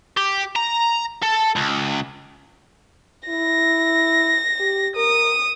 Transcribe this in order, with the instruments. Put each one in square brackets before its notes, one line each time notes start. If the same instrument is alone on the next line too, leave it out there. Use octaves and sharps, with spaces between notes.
[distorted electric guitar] G4
A#5
A4
C#2
[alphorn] E4 [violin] A#6
[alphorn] G4
[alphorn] A#4 [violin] D#6